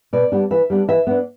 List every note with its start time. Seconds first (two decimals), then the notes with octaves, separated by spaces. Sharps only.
0.13 B2 D5
0.32 G3 B3 D4
0.50 E3 E5
0.70 G3 B3 D4
0.88 E3 E5
1.07 B3 D4